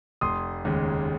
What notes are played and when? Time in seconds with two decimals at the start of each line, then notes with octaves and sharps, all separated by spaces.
0.21 F1 C6 D#6
0.65 D#2 C#3 G#3